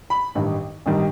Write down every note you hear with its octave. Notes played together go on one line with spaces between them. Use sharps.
B5
A1 G2 D#3 G3
A1 G2 D#3 G3